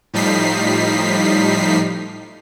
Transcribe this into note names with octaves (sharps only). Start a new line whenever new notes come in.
A2 F3 G3 D#4 B6 C7